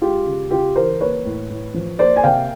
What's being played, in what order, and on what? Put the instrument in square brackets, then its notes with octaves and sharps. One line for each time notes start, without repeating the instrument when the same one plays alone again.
[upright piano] G#3 F4 G4
C#3
C#3 F4 G4
E3 A#4 C5
A#3 B4 C#5
A2
A2
F3
A#3 C5 D5
G#5
C3 F5 G5